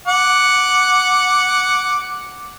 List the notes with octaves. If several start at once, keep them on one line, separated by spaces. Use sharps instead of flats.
F#5 D6